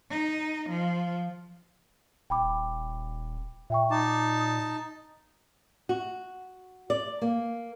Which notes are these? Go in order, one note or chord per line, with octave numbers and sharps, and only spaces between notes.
D#4
F3
D#1 G5 B5 D6
A#2 E5 G5 C#6
D#4 A5 D6
D#6
F#4
D5
A#3